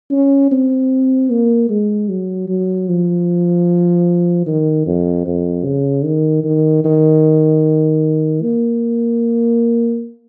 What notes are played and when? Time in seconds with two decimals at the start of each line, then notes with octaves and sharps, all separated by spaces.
0.11 C#4
0.51 C4
1.30 A#3
1.69 G#3
2.09 F#3
2.48 F#3
2.88 F3
4.46 D#3
4.86 F2
5.26 F2
5.64 C#3
6.05 D#3
6.44 D#3
6.84 D#3
8.42 A#3